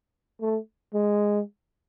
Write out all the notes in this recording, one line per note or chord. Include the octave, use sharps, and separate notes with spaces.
A3
G#3